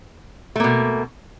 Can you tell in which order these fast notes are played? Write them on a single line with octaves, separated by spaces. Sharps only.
A3 A#3 B2